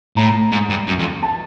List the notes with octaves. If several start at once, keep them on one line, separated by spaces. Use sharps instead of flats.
A2 A#5
G#2
G2
F#2
F2
A5